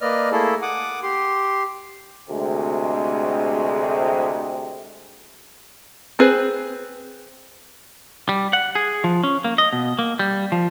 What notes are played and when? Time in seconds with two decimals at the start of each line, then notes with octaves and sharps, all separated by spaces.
0.01 A#3 B4 D5 D#5 F6
0.32 A3 A#3 E4 G#4 A4
0.62 F#5 D6 D#6
1.03 G4 C6
2.30 D2 C3 G#3
6.19 C4 G#4 B4 C5
8.29 G3
8.53 F#5
8.75 G#4
9.04 F3
9.24 C#4
9.44 A#3
9.58 D#5
9.73 B2
9.99 A#3
10.19 G3
10.52 F3